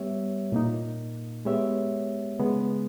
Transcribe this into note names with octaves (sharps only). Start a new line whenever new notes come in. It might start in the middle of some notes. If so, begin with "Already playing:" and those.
Already playing: G3 B3 G4 C#5 E5
A#2 A#3 D#4
G#3 B3 G4 C#5 E5
C#3 G#3 B3